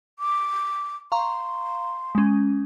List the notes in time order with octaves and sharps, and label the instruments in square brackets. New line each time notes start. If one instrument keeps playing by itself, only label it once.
[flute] D6
[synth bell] F5 A#5 C#6 [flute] C6
[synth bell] G#3 C#4